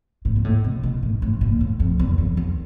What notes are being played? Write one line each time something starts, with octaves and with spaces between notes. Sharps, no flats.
A2
A#2
A2
B2
B2
A2
A2
A#2
A2
F2
E2
F2
E2